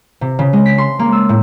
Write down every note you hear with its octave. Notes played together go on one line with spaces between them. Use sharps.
C3
C#3
G#3
B6
C6
A#3
E6
A2